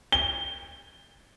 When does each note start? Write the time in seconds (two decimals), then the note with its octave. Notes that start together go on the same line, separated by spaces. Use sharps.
0.12 G7